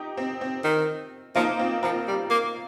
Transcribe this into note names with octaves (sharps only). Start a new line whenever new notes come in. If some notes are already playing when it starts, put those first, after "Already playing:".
Already playing: D#4 G4
C4
C4
D#3
F3 A#3 D#4
C4 F4
F3 F4 A#4
G3
A#3